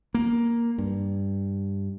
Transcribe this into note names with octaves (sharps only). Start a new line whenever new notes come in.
A#3
G2